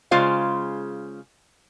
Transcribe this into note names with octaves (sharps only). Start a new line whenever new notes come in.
C#3 G#3 F4 C5 F5